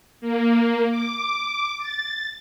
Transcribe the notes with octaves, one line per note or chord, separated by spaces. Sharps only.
A#3
D6
A6